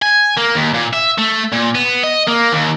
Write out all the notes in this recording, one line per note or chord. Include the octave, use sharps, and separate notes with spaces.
G#5
A#3
D#2
A#2
E5
A3
A#2
B3
D#5
A#3
D#2